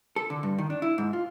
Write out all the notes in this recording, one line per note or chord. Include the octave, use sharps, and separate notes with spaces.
A4
D3
G2
D#3
D4
E4
G#2
F4